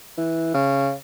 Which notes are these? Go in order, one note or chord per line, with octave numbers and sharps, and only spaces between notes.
E3
C#3